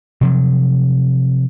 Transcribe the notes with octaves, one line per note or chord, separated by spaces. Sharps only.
C3 F3 F#3